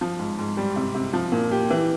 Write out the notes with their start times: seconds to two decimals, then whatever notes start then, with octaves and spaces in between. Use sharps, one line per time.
0.01 F3
0.19 G#2
0.39 G#2
0.57 G3
0.76 C3
0.95 C3
1.13 F3
1.32 A#2
1.51 G4
1.70 E3